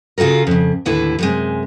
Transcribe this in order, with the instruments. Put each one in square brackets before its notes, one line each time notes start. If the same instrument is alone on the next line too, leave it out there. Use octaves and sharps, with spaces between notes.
[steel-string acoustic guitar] C#3 F4 F#4 A4 A#4
F2 C#3
D#2 A2 D3 E4 B4
F#2 C3 G#3